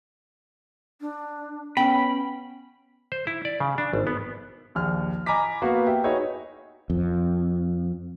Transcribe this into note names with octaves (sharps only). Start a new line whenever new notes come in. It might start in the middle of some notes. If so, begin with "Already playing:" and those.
D4
B3 C#4 G5 B5
C5
E4
D5
C#3
D4
G#1
B3
A#1 D#2 F6
D#5 G#5 A#5 B5 D6 B6
A#3 B3 F#4
G4 E5
D#4 F#4 G#4 B4 C#5 E5
F2